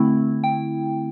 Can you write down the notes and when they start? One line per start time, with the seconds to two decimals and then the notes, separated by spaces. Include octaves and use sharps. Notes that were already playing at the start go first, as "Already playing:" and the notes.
Already playing: D3 A3 C4 E4
0.44 G5